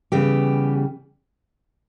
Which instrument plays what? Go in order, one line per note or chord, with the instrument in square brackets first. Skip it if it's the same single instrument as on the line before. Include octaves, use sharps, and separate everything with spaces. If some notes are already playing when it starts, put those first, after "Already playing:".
[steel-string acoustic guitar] C#3 E3 G3 B3 G4